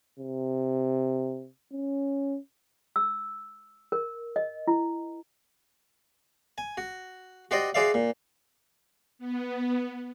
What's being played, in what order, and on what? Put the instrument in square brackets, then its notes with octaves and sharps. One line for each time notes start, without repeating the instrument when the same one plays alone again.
[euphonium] C3
C#4
[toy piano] E6
A#4
D#5
E4
[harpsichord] G#5
F#4
F#4 G4 C5 D5 D#5
F#4 G#4 C5 D5 E5 F5
A#2
[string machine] B3